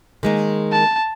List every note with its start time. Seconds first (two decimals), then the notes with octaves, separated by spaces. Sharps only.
0.23 D#3 G#3 A#3
0.72 A5